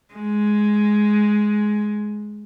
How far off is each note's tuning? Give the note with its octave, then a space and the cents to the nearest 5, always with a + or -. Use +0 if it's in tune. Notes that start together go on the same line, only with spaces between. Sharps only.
G#3 +10